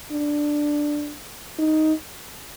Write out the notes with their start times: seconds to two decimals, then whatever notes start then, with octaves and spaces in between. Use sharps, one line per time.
0.12 D4
1.59 D#4